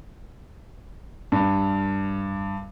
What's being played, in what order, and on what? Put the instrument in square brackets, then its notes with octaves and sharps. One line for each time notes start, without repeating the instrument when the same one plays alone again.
[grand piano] G2